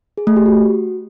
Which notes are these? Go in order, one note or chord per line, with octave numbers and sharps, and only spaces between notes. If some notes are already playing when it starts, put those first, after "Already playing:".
G#4
A3
G4
F#4